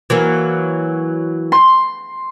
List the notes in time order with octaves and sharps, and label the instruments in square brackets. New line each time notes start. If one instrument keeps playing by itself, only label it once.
[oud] E3 F#3 A#3
[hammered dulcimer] C6